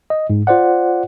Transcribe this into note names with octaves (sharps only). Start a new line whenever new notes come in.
D#5
G#2
F4 C5 D5 F#5